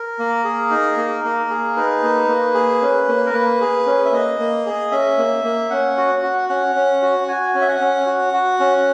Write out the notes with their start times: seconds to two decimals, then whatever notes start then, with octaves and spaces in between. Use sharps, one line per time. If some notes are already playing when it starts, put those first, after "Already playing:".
Already playing: A#4
0.19 A#3
0.44 G#4
0.70 D#4
0.97 A#3
1.24 A#3
1.50 G#4
1.76 D#4 B4
2.03 A#3
2.29 A#3
2.54 G#4
2.81 C#4
3.08 A#3
3.26 A#4
3.33 A#3 B4
3.61 G#4
3.86 C#4
4.05 E5
4.12 A#3 D#5
4.40 A#3
4.66 G#4
4.91 C#4 E5
5.18 A#3
5.44 A#3
5.70 C#4 F#5
5.97 F#4
6.23 F#4
6.49 C#4 F#5
6.76 C#4
7.02 F#4
7.28 F#4 G#5
7.55 C#4
7.61 E5
7.68 F#5
7.81 C#4
8.07 F#4
8.33 F#4
8.60 C#4